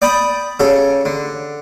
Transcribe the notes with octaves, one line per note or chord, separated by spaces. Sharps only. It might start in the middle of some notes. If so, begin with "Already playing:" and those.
D5 G5 B5 D#6
C#3 G4 A4
D3